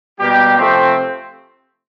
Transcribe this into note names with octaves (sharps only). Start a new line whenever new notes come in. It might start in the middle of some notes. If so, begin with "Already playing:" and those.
B2 G3 A#3 G4
C3 F3 A3 C4